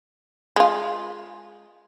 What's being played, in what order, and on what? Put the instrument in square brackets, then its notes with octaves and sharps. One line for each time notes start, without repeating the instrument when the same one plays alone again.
[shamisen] G#3 F4